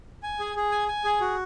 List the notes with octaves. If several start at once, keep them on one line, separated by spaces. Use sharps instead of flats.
G#5
G#4
G#4
G#5
G#5
G#4
F#4